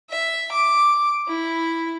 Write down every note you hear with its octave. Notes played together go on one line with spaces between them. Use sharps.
E5
D6
E4